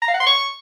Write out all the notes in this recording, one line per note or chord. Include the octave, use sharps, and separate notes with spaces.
A#5
F5
F#5
C6
C#6